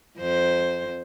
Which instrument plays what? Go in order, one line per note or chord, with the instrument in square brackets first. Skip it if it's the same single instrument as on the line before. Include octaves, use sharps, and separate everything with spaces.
[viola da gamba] F2 C5